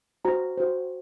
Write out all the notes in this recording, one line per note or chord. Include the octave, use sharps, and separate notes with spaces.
F#4 C5 A#5
F#4 C5